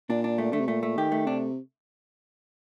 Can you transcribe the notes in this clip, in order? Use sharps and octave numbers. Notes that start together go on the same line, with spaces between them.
A#2 D4
D4
A3
D3 A3
C3
A#2 A3
A3
D#3 G4
A3
C3 D4